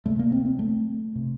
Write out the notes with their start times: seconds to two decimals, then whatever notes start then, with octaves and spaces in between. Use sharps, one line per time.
0.06 D2 C3 A3
0.19 A#3
0.32 C4
0.45 C4
0.59 A3
1.16 C3